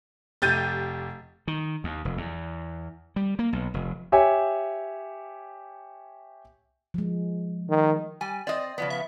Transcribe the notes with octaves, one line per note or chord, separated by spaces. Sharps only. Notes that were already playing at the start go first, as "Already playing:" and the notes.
F1 G4 G6 A6 D#7
D#3
D#2
F1
E2
G3
A#3
B1
F1
G4 C#5 E5 G#5
F3 G#3
D#3
G3 G#5
C4 D5 D#5
C#3 F3 B3
E5